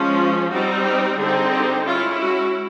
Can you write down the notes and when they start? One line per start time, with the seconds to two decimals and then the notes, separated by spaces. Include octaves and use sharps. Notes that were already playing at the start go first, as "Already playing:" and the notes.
Already playing: F3 G#3 C#4
0.51 G3 C4 D#4 F#4
0.85 G4
1.18 D3 G3 C4 D#4 G#4
1.53 G4
1.86 G#3 C#4 E4 F4
2.20 F#4